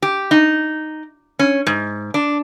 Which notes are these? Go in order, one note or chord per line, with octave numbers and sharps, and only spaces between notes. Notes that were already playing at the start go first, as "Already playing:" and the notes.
G4
D#4
C#4
G#2
D4